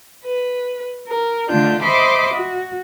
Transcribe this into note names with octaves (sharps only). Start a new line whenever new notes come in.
B4
A#4
D3 D#3 A3 D4 F4 G6
C5 D#5 E5 B5 C6 D6
F#4